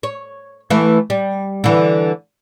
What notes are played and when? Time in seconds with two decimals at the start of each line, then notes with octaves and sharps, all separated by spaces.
0.03 C#5
0.70 E3 A3
1.10 G3
1.64 D3 E3